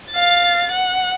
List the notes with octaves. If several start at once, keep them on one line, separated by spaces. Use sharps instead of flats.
F5 A6
F#5